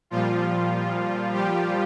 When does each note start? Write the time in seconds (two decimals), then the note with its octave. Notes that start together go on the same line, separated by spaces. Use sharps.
0.10 A#2 F3 G3 F4
1.33 G3 G4